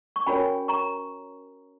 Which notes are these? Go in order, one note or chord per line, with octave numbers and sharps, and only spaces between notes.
C#6
C#4 F#4 A#4 C#5 G#5 B5
A#5 C#6